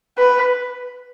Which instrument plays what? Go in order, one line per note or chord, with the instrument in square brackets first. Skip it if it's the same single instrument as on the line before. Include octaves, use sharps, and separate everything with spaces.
[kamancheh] B4